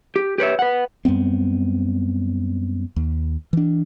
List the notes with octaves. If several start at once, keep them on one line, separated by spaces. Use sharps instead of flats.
G4
G4 B4 C#5 E5
B4 F#5
F#2 G3 B3 C4
D#2
E3 D4